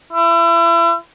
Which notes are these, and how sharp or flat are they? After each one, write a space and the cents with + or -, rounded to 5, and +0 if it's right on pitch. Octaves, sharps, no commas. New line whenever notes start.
E4 +35